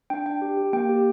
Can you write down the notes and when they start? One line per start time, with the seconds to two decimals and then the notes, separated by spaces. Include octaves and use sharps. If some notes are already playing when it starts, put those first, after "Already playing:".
0.10 D4 G5
0.26 D4 G5
0.42 G4
0.57 G4
0.73 A#3 G5
0.89 G4